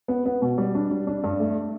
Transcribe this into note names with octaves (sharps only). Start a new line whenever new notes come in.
B3
B3
B2
G3
D4
G3
D4
G2
A3